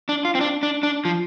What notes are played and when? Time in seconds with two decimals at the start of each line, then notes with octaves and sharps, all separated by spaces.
0.09 D4
0.25 F4
0.35 C4
0.41 D4
0.63 D4
0.83 D4
1.05 F3